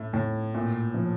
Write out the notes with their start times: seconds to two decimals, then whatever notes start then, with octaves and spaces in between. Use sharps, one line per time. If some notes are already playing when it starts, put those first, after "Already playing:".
Already playing: A2 A3
0.13 A2
0.54 A#2
0.94 F3